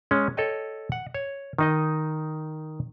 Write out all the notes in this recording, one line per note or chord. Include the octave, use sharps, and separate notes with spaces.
G#3 C#4
A4 C#5 D#5 G5
F#5
C#5
D#3 D#4 D#5